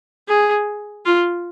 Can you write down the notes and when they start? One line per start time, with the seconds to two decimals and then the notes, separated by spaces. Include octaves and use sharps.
0.28 G#4
1.05 F4